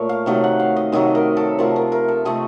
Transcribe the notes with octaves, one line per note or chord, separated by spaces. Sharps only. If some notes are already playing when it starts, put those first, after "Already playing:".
Already playing: A#2 A3 A#4 C#5
F5
C3 D#3 F#3 A3 D#5
F#5
F5
D#5
C3 D#3 F#3 A3 D#5
A#4
A4
C3 F3 A3 A#4
A#4
A#4
A4
C3 F3 A3 D#5